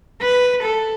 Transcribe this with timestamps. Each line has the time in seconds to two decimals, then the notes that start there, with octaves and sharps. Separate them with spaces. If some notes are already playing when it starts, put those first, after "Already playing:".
0.21 B4
0.63 A4